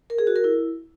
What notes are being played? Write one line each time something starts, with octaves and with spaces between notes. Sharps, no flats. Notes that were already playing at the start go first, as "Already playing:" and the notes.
A#4
G#4
F#4
A#4
E4